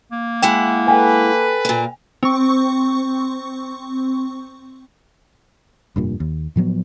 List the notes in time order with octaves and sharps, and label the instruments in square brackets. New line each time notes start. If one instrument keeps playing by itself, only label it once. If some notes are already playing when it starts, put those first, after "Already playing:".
[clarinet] A#3
[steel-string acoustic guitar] G#3 E4 F#5 [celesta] G5
[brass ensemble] A4 B4 [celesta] G5 G#5
[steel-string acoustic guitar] A#2 A#3
[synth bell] C4 C#6
[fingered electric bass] F1 G2 A#2
D#2
A2 F3 F#3 B3